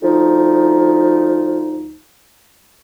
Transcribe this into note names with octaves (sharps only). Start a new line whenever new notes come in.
D2 F3 D#4